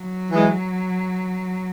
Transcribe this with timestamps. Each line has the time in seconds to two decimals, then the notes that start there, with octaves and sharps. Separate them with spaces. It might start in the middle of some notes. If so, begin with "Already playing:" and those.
Already playing: F#3
0.31 E3 G#3